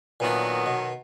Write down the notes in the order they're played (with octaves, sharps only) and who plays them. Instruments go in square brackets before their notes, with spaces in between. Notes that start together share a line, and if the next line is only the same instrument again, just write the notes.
[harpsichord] A#2 D4 [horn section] D#3 F#3 B3
[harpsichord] B2